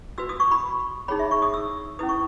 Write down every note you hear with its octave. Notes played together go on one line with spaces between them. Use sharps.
F#4 B4 E6
D#6
C#6
B5
D#4 G#4 C#5 B5
E5
C#6
D#6
E6
C#4 E4 B4 D#6
C#6